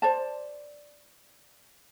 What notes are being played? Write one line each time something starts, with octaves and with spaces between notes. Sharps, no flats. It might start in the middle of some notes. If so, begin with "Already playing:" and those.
C5 D5 A5